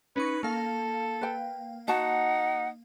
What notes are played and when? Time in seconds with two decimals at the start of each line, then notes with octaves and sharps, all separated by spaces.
0.16 C#4 D#4 B4 C#6
0.43 A#3 A4 F5
1.21 B4 G5
1.88 D#4 F#4 F#5 A5